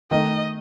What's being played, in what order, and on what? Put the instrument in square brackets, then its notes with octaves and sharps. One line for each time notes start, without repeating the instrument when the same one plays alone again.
[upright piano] D#3 A3 D#4 [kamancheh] D#5